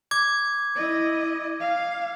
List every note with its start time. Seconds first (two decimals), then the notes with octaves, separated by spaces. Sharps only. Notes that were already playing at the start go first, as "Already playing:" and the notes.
0.11 D6 G#6
0.76 E4 D#5
1.60 F5